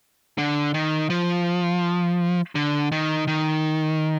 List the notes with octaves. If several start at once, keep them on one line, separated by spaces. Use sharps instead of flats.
D3
D#3
F3
D3
D#3
D#3